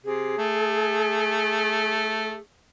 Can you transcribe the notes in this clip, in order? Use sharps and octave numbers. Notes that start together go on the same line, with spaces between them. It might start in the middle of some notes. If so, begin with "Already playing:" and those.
C3 G#4
A3